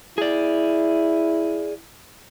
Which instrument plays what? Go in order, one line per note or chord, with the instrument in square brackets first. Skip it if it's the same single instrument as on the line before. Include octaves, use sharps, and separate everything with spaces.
[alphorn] E4 [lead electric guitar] G#4 D5